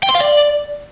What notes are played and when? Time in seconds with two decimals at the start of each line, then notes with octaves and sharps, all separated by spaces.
0.03 G5
0.09 C6
0.15 F5
0.21 D5